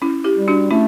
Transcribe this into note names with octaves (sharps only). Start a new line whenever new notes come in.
C#4 E4
E4 G4
G3
D4 F#4
A3 C#4 E4